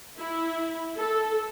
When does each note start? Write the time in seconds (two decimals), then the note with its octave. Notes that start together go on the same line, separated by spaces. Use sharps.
0.18 E4
0.97 A4